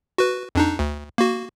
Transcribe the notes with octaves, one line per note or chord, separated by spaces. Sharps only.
F#4 B4
F2 D4 D#4
D2
A#3 F#4